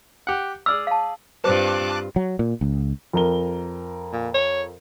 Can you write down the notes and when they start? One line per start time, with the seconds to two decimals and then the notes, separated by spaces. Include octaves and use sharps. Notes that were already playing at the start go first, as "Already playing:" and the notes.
0.27 G4 F#5
0.66 G#4 D5 E6 F6
0.87 F5 A5
1.44 G2 C4 F4 B4 C5 A5 D6 F#6
2.16 F#3
2.39 A#2
2.61 C#2
3.13 F2 A#4 G7
4.13 A#2
4.34 C#5